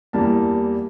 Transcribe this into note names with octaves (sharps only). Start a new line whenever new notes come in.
E2 E3 G3 A#3 A5